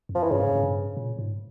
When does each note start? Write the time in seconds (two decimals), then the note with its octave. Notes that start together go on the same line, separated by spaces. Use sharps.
0.09 F2
0.15 F3
0.23 E3
0.31 G2 C#3
0.39 G#2
0.47 G2
0.55 G#2
0.63 G2
0.97 A#2
1.19 G#2